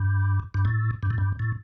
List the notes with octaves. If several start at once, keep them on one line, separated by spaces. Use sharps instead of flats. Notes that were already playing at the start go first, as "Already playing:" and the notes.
Already playing: G2
G2
A2
G2
A2
G2
A2